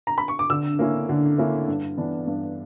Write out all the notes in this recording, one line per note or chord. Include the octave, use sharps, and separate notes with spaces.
A#5
B5
C#6
D6
D3 E6
A#3 C#4 E4
D3
A#3 C#4 E4
G2
E3 B3 D4
G2